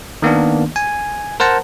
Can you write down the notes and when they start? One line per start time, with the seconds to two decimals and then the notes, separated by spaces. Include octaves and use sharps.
0.22 D#3 A#3 B3 D4
0.76 G#5
1.40 A#4 C5 F#5 A5 A#5